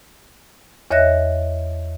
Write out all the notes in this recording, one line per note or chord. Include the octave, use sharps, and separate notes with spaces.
E2 C#5 D#5 E5 F#6 A#6